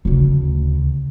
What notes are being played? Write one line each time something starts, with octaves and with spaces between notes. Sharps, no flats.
D2 C#3